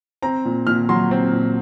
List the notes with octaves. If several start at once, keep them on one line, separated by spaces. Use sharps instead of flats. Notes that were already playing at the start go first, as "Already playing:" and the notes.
C4 A#5
A#2
A#2 F6
F#3 C6
C4
A#2